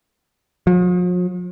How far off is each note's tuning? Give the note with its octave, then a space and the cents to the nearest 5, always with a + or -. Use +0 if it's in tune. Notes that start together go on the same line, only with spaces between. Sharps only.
F3 +45